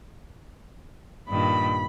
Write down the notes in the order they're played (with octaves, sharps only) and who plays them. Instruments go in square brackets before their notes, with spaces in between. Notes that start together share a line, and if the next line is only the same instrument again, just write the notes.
[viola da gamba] G2 A#2 D#3 [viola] B5